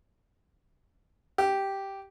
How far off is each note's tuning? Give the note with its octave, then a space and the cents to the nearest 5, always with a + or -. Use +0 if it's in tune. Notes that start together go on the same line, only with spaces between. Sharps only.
G4 -5